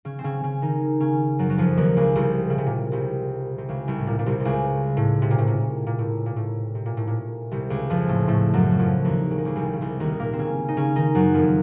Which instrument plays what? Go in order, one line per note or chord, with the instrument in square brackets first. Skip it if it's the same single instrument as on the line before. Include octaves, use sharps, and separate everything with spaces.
[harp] C#3 C#4
C4
C#3 C#4
C#3 C#4
D#3 D#4
C#3 C#4
F#2 F#3
F#3
F2 F3
D#2 D#3
C#2 C#3
C2 C3
C#3
C3
A#2
C2 C3
C3
C#2 C#3
C2 C3
A2
A#2
A#2
C2 C3
C3
C#2 C#3
A2
C3
A#2
A2
A#2
A#2
A2
A#2
A2
C3
A#2
A2
A#2
C2 C3
C#2 C#3
F2 F3
A2 A3
A2 A3
F#2 F#3
F#3
F2 F3
D#2 D#3
C#3
D#3
C#2 C#3
C2 C3
C#3
C2 C3
D#2 D#3
A#2 A#3
C4
C#3 C#4
D#4
C#3 C#4
D#3 D#4
F#2 F#3
F2 F3